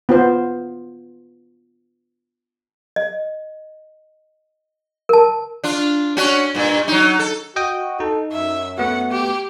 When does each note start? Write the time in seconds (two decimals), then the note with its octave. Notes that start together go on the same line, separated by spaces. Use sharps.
0.09 B3 F4 C5
2.96 D#5
5.09 A#4 A5
5.64 D4 F4
6.17 C#4 D4 F#4
6.55 G2 A#2
6.88 F#3 D#4
7.19 A4
7.56 F#4 D#5 G5 D#6
8.00 D#4 A4
8.32 F#2 E5
8.78 A3 B3 F#4 F#5
9.11 G4